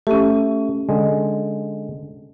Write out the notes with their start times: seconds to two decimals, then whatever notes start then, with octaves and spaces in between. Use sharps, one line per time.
0.07 A3 C#4 G4
0.89 D3 G#3